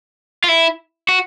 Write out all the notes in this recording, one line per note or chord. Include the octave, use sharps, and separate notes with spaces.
F4
E4
F#4